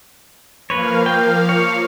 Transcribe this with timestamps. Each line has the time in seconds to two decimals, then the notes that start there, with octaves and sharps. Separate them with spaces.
0.70 F3 A#3 B4 C#5 F5
1.06 G5
1.49 C#5